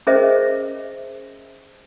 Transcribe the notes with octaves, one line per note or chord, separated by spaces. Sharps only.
C#4 G#4 A#4 C5 D#5 E5